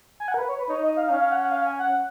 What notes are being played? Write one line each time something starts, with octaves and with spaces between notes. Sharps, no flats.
G#5
F#5
A#4
B4
C#5
B4
D#4 C#5
D#5
F5
C#4 F5
F5
F#5
F#5
F5
G#5
F#5